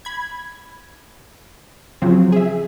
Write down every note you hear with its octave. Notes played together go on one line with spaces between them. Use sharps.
B5 G#6
C#3 F3 F#3 C4
G#4 E5